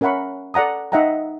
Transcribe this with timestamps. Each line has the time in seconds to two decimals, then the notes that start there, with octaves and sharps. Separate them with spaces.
0.01 C#4 A#4 E5 F#5 B5 C#6
0.54 A4 D5 F#5 A#5 D#6
0.92 D#4 D#5 E5 F#5 G5 A#5